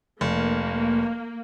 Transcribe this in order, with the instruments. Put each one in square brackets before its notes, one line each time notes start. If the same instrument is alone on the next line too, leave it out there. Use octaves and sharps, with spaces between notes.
[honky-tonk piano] F1 [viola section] A#3